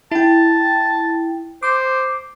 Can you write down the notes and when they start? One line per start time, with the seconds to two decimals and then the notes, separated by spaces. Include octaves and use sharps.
0.12 E4 G5 A5
1.63 C5 D6